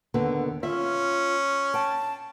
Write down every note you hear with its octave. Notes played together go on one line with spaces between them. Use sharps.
D#2 D3 B3
C#4 F4 E5
G5 A5